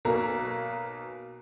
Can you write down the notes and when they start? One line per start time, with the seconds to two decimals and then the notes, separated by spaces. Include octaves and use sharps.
0.05 B1 B2 A#3 A#4 A#5